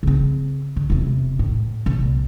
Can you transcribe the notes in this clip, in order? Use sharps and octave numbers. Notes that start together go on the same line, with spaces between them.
C#3 C4
D3
E1 C3
A2
C2 A#2